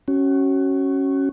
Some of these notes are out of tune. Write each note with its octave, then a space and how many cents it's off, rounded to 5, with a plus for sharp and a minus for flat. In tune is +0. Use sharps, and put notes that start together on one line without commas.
C#4 -10 F#4 +25